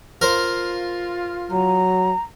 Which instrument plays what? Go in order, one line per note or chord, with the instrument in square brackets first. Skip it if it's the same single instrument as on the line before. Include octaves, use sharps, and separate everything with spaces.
[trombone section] F4 [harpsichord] A#4 C5
[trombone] F#3 [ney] A#5